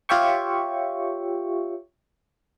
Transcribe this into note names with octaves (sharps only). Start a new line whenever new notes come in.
F4 G4 C#5 E5 G5 C#6